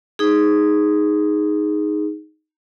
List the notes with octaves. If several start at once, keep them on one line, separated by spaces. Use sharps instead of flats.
D#4 G#4